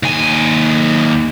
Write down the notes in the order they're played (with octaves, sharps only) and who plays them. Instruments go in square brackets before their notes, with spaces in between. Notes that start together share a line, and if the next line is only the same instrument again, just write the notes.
[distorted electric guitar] D#2 G#5